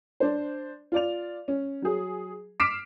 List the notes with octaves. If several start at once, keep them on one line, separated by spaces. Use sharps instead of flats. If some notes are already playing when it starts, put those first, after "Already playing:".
D4 C5
F4 D5 F7
C#4
F#3 G#4
D6 F6 B6 C7 D7 E7